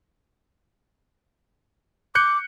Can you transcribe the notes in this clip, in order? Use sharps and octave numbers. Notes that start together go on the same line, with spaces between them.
D6 F#6 G6 C#7